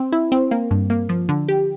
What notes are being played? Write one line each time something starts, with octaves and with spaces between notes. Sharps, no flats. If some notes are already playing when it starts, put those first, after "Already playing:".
Already playing: C4
E4
C4
A#3
G2
A#3
F3
D3
G4